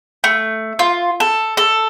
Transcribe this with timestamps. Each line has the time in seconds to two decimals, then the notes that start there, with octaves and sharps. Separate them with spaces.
0.24 A3
0.79 F4
1.20 A4
1.57 A4